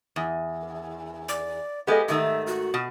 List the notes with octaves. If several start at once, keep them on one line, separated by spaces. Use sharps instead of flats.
E2
D5
G#3 B3 G4 A4 D#5
G#2 D#3 A3 E5
F#4
B2